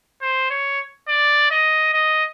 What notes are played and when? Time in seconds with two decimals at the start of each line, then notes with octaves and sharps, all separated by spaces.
0.22 C5
0.51 C#5
1.08 D5
1.51 D#5
1.94 D#5